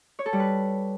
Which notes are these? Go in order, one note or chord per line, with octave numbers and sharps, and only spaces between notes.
C#5
A4
G3
B4